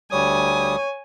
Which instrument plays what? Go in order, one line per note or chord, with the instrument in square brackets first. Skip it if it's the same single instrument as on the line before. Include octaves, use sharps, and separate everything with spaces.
[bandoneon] D2 G3 D#6 [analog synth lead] C#5 [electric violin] G#5